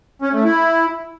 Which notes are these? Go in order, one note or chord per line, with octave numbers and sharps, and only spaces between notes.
C#4
A3
E4